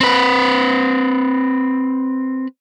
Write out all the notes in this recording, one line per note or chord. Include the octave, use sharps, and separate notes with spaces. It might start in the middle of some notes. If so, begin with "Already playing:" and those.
C4 B4